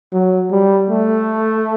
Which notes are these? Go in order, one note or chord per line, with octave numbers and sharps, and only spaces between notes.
F#3
G3
A3